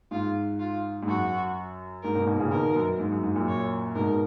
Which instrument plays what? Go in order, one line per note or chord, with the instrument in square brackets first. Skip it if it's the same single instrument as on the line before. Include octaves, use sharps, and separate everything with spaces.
[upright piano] G#2 [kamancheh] F4
[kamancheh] F4
[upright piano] G#2
[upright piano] F#2 [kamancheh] F#4
[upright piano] G#2 [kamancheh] A#4
[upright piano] G#2 B2
G#2 B2
A#2 C#3
[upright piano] B2 D#3 [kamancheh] A#4
[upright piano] F#2
G#2
F#2
G#2
F#2 A#2
[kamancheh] C#5
[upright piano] G#2 B2 [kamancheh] A#4